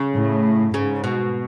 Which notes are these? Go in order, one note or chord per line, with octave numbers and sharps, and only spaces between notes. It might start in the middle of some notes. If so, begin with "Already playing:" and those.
Already playing: C#3
A2
G#2 C#3
B2